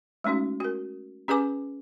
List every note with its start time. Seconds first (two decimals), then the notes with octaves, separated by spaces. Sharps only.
0.24 G#3 A3 C#4 D#4 F#4
0.60 F#4 A#4
1.28 C#4 G4 G#4 B4 G#5 D6